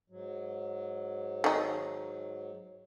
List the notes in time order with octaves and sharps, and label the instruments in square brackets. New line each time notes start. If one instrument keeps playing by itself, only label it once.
[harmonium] G#2 F#3
[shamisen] D#3 D#4